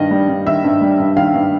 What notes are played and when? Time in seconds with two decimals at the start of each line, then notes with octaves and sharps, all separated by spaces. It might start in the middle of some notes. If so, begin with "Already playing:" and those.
Already playing: G2 D#3 D#5
0.11 G3
0.29 G2
0.46 D#3 E5
0.64 G2
0.81 G3
1.00 G2
1.17 D#3 F5
1.34 G2